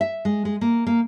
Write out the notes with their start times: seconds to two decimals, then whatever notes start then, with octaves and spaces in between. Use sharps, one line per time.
0.01 E5
0.25 G#3
0.45 G#3
0.61 A#3
0.87 A#3